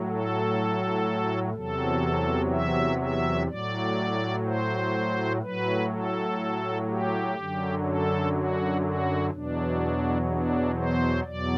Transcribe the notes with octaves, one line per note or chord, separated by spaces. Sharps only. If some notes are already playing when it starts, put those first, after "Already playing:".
Already playing: A2 F#3
A4
E2 C3 F#3 A4
E5
E5
A2 F#3 D5
C5
A2 F#3 B4
A4
G4
F#2 D3 F#3
A4
F#4
F#4
E2 B2 F#3 D4
D4
C5
E2 B2 F#3 D5